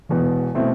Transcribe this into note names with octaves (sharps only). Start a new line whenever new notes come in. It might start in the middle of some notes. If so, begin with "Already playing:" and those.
E1 E2 B2
B2 A3 C4 E4